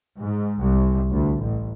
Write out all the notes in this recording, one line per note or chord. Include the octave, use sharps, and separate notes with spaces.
G#2
C2
D2
A1